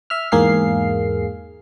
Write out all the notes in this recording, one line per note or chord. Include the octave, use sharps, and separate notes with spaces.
E5 F6
E2 G#2 A#3 G#4 F5 C7